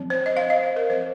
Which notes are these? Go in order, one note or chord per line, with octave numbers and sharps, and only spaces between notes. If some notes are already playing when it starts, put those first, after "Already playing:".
Already playing: F3 C4
C5
D#5
F5
D#5
C5
A#4
F3 C4 C5